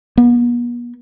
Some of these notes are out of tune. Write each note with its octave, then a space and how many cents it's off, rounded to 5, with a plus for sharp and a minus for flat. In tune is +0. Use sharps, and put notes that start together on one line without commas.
B3 -45